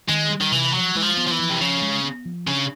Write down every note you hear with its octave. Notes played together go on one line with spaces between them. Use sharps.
D#3 G#3
G3
D#3
C3 E3
F3 F#3
E3 G#3
F3
B3
F3
E3
F3
C3
C#3 F3
G#3
B3
F3
C#3 D4